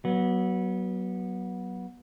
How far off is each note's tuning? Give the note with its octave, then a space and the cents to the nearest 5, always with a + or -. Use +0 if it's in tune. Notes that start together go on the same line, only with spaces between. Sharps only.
F#3 +20 B3 -20